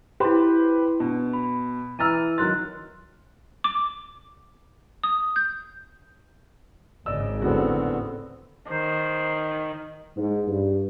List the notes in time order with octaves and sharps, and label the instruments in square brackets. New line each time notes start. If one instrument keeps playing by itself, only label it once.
[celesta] E4 C6 [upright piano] G4 B4 C5
[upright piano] B2 [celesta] D4
[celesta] B5
[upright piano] E3 A#5 F6 [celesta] E6 A6 D#7
[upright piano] D#3 F#3 A6 [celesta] C6 F#6
[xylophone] D6
D#6
G6
[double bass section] G#1 C#3 [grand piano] D5 D#5 E6
[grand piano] D1 F#4 [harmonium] D3 B3 C4
[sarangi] D#3 [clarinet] C5
[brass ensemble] G#2
G2